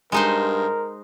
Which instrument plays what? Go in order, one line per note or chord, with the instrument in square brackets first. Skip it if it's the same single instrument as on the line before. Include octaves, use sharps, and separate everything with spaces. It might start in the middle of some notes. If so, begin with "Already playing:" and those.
[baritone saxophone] G2 [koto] G#3 D#4 C5 [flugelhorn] A#4